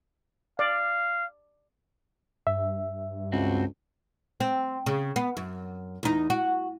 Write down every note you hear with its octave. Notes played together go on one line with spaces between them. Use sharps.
D5 F5
G2 E5
C#2 C4 F#4
C4
C#3
B3
F#2
E2 D#4
F#4